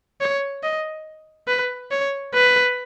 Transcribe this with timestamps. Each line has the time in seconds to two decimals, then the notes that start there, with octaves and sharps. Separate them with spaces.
0.21 C#5
0.63 D#5
1.48 B4
1.91 C#5
2.34 B4